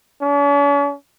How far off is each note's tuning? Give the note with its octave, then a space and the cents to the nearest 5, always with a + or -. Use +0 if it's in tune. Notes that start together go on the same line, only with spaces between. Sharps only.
C#4 +45